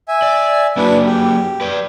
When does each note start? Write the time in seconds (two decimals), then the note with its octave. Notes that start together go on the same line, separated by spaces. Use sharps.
0.08 E5 G#5
0.22 D5
0.77 F#3 A#3 D4 F#4 B4
1.06 G4
1.61 B4 D5